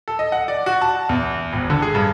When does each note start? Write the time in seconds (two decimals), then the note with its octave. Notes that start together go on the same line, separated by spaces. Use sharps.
0.08 A4
0.19 D#5
0.32 F#5
0.48 D5
0.66 F#4
0.82 A5
1.09 E2
1.53 G#1
1.70 D3
1.82 G#4
1.95 G2